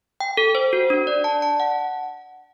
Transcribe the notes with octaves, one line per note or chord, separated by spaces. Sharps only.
G5
A4
C5
F#4
D4
D5
A5
A5
F#5